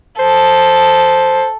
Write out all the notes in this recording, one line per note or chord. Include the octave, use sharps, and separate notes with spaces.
A4 C5